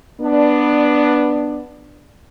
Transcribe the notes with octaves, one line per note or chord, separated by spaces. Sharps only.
B3 D4